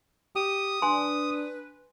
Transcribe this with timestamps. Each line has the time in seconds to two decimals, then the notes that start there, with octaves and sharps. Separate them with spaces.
0.36 G4 D#6
0.82 D4 B4 G#5 C6